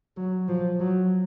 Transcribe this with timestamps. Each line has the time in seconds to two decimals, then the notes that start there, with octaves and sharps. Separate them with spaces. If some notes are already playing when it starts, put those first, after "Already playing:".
0.17 F#3
0.48 F3
0.80 F#3